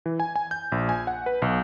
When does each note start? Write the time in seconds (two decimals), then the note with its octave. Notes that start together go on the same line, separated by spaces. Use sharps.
0.06 E3
0.20 G#5
0.36 G#5
0.51 G6
0.72 A#1
0.89 G#5
1.07 F#5
1.26 B4
1.42 B1